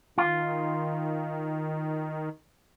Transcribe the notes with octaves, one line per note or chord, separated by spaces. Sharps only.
D#3 F4